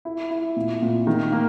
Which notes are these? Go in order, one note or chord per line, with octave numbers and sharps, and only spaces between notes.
E4
E4
A#2
A#2
D#3
A#3